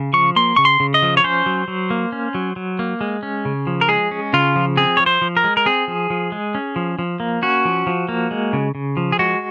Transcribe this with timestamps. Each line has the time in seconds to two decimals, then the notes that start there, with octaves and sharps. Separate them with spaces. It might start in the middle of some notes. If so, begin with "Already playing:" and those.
Already playing: C#3
0.13 F3 C#6
0.36 A#3 C6
0.56 C#3 C#6
0.65 C6
0.80 C#3
0.94 D#5
1.02 F3
1.17 C#5
1.24 C#4 C5
1.46 F#3
1.68 F#3
1.90 A#3
2.12 C#4
2.35 F#3
2.56 F#3
2.79 A#3
3.01 G#3
3.23 C#4
3.45 C#3
3.67 F3
3.81 A#4
3.89 G#3 G#4
4.11 C#4
4.33 C#3 F4
4.56 F3
4.77 C4 G#4
4.97 F3 C#5
5.06 C5
5.22 F3
5.37 A#4
5.44 G#3
5.57 A#4
5.66 C4 G#4
5.88 F3
6.10 F3
6.32 G#3
6.55 C#4
6.76 F3
6.99 F3
7.20 A#3
7.42 C#4 F#4
7.65 F3
7.87 F3
8.09 A#3
8.31 G#3
8.53 C#3
8.75 C#3
8.97 F3
9.12 G#4
9.19 G#3 F#4